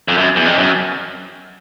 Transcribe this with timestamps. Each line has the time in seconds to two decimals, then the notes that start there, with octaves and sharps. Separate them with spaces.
0.08 F2
0.18 F#2
0.36 E2
0.46 F2
0.58 F#2